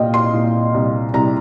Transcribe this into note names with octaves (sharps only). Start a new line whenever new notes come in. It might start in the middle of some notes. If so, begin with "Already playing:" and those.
Already playing: C2 A#2 D#5 F5 G5
C6
A#2
C2
C2 A#5